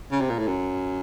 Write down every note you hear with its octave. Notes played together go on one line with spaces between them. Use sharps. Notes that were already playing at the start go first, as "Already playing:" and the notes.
C#3
C3
A#2
A2
F#2